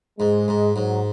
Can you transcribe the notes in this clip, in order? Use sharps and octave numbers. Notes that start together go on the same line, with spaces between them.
G#2 G#3
G#2
G#2 F#3